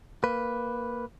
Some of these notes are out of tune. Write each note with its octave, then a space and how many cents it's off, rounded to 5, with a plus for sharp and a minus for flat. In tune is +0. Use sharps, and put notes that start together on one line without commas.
A#3 +0 B4 +0